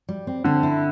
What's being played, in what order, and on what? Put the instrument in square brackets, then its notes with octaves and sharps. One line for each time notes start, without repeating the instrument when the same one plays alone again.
[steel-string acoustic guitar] G3
C4
[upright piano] D3 [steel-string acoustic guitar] C4
[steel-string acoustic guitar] E4